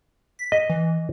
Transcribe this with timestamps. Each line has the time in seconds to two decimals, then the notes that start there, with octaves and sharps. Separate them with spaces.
0.39 B6
0.52 D#5
0.70 E3